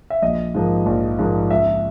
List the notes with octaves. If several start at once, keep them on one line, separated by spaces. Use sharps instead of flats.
E5
A#1 D#5
G#2 F3 A#3
A#1
G#2 F3 A#3
C#2 E5